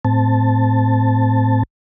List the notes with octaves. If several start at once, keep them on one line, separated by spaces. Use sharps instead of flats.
A2 C4 A5